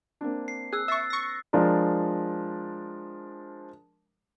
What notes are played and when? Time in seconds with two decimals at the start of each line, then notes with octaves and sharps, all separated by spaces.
0.21 A#3 C4 D4
0.48 C7
0.73 G#4 E6 F#6
0.88 E5 C#6 E6 A6 C7
1.10 C#6 A#6
1.53 F3 G#3 D4 A#4